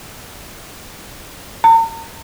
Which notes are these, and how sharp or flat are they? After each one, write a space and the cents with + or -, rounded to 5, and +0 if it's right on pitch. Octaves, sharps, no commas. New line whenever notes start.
A#5 -45